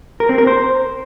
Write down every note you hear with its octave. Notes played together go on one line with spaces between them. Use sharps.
A#4
C4
A#4
C5